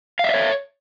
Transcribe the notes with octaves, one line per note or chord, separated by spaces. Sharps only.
C#5 D5 E5 F5